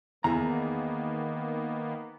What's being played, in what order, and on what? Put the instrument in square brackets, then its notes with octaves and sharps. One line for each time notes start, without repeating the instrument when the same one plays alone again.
[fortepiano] E2 [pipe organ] D#3 A#3 B3 [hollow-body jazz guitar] G#4 A#5